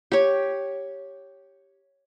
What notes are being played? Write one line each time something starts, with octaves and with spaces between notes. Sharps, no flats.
G4 C#5